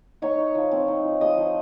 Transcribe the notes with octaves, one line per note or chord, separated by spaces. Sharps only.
D#4 C#5 C#6
D#4
F3
C4
D#4
F3
F3 D#5 D#6
F3